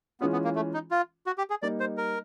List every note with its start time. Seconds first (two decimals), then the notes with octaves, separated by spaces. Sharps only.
0.21 E3 G#3 B3 C#4 F4
0.32 B3
0.44 A#3
0.56 A3
0.74 D#4
0.91 F4
1.27 F#4
1.38 G4
1.50 G#4
1.62 G3 A#3 D#4 D5
1.80 C5
1.97 A#4